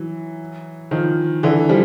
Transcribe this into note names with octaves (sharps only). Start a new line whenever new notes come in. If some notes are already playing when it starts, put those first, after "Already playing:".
Already playing: E3 F#3
D#3 F3
D3 E3
F3 G3